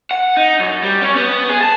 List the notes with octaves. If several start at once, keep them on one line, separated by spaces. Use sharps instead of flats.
F#5
D#4
F#2
G3
C#4
B3
G#4
A5